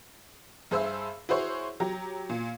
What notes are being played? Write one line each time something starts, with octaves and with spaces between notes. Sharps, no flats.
G2 G#4 C5 E5 E6
E4 F#4 G#4 C5 C#5
F#3 G4 A#5
A#2